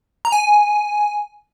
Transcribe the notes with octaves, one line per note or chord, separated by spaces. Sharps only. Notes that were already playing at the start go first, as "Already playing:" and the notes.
A#5
G#5